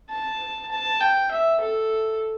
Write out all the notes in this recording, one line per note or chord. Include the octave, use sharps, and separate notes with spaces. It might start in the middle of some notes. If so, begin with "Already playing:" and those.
A5
A5
G5
E5
A4